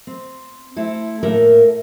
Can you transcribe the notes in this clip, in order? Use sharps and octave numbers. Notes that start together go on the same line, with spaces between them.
C4
A3 C4 E4 A4
A2 A#3 A4 A#4 E5